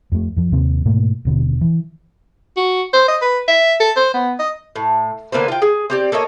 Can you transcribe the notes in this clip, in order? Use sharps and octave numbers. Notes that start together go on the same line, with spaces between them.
F2 A3
F2 F3
D#2 C3 A#3 C4
G#2 B2 A3 A#3
D#1 B2 D3
E3
F#4
C5
D#5
B4
E5
A4
C5
B3
D#5
A2
D3 A#3 B4 C5
F4 G5
G#4
C4 G4 D5
A#3 A4 C#5 D#5